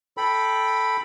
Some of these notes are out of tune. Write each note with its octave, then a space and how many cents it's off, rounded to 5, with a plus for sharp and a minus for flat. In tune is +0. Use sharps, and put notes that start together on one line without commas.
A4 +0 G5 +0 B5 +0